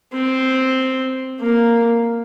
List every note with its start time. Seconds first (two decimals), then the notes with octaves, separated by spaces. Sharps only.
0.13 C4
1.40 A#3